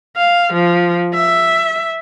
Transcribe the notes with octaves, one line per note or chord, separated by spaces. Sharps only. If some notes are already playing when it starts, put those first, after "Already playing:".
F5
F3
E5